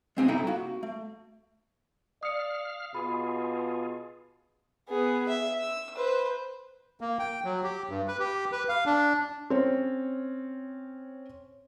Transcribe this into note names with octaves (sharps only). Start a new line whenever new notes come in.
G#3 C4 G4 G#5
C2 D#4 E4 A4 E5 G5
A#3 F#4
A3
D5 F5 D#6 F6 C#7
B2 F4 G#4 B5
B3 G#4
E5
E6
B4 C5
A#3
G5
F#3
G4
G2
B4
G4
B4
F5
D4
C4 C#4 C#5